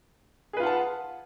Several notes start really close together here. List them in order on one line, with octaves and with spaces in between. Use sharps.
G#4 B4 F4 F#5 A5